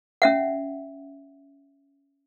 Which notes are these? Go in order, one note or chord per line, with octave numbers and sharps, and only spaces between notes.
C#4 E5 F#5